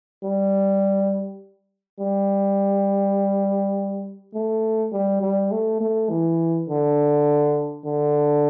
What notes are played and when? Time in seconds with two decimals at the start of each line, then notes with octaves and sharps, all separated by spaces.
0.24 G3
1.99 G3
4.34 A3
4.92 G3
5.22 G3
5.52 A3
5.81 A3
6.10 E3
6.69 D3
7.85 D3